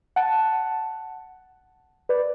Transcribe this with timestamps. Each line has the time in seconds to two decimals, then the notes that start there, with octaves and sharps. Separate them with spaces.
0.16 F#5 A5
2.09 B4 D5